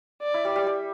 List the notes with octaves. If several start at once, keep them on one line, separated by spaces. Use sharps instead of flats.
D5
E4
G3
G3
G3